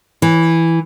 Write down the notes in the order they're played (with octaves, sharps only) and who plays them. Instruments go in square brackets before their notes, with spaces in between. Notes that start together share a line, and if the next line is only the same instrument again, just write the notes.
[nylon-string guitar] E3